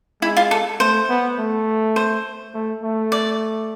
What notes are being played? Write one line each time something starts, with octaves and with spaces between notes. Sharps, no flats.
G#3 E4
F4
A4
A3 C5
B3
A3
C5
A3
A3
D5